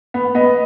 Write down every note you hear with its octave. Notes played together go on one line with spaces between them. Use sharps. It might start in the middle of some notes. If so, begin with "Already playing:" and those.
B3
B3 D#5